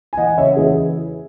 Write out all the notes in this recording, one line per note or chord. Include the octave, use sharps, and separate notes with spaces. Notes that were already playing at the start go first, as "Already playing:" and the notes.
G#5
E3 D#5 F#5
C#3 C#5 E5
E3 G#4